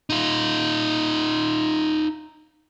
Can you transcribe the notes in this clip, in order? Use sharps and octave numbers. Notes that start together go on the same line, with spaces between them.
D#4 F4